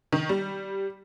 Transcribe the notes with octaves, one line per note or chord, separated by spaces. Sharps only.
D#3
G3